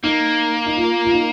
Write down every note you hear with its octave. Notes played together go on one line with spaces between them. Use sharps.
A#3 D#4
D#4
F4
F4
D#4